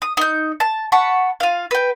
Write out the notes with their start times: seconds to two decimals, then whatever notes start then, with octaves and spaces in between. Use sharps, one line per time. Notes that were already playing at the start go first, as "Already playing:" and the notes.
0.02 D#6
0.17 D#4 G6
0.60 A5
0.92 F#5 A5 B5 C#6
1.40 F4 F5
1.71 B4 G5